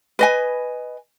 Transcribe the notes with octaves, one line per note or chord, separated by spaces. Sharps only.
B4 D#5 G#5